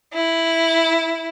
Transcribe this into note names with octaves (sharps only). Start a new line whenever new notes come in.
E4